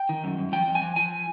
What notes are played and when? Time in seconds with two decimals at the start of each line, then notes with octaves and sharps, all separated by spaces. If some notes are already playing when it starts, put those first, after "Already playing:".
Already playing: G5
0.09 D#3
0.24 F#2
0.38 F#2
0.52 F3 G5
0.67 F2
0.75 G#5
0.82 F3
0.96 F3 G#5